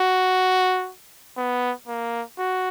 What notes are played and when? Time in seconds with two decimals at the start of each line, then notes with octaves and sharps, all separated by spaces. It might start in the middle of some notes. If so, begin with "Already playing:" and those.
Already playing: F#4
1.38 B3
1.87 A#3
2.39 F#4